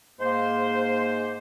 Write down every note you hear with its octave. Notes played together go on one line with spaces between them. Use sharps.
G#2 A#3 C5